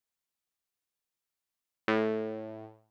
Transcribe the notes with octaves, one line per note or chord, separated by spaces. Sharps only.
A2